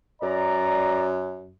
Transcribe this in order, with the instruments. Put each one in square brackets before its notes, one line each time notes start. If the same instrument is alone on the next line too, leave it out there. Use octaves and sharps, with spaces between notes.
[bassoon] F#2 [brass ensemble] D5 A#5